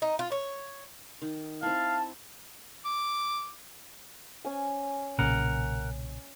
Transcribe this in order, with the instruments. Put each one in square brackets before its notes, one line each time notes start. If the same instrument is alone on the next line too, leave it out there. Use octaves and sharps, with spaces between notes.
[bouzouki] D#4
F4
C#5
[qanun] D#3
[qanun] C4 E4 [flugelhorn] F5 [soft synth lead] A5
[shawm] D6
[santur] C#4 G#5
[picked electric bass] B1 A#2 C#3 [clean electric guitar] A#4 F#5